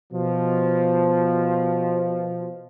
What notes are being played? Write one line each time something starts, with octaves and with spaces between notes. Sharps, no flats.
B2 F3